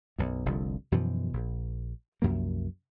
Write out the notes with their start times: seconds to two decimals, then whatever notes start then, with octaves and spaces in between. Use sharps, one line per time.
0.18 B1 F#2
0.45 F1 C2 F2 D3
0.92 F#2 B2 E3 F3
1.33 A#1
2.22 C2 F#2 F3 A#3